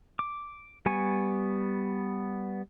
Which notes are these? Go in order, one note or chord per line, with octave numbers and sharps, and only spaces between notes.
D6
G3 B3 G#5 C#6